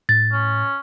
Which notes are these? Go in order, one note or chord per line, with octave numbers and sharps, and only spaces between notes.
A2 A6
C#4